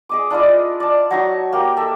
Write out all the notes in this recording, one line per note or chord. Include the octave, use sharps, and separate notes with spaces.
G#4 D#5 D6
D4 E4 F4 D#5
D5 A5
F#3 D#4 C#6
A#3 G4
A4 E5